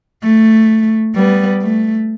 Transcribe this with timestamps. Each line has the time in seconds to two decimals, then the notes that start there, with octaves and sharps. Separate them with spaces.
0.23 A3
1.14 G3 B3
1.61 A3